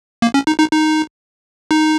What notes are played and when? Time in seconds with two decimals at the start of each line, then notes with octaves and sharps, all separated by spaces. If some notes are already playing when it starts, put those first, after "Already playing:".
0.22 A#3
0.34 C#4
0.47 D#4
0.59 D#4
0.72 D#4
1.71 D#4